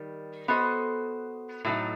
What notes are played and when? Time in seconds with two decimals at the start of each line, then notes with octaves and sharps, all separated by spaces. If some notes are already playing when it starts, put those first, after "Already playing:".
Already playing: D#3 G3
0.48 B3 F#4 A4 C5 D#5
1.65 A2 F#3 A3 D#4